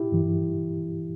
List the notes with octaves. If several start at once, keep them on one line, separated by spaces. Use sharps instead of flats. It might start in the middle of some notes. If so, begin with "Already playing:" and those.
Already playing: E4 G4
G2 E3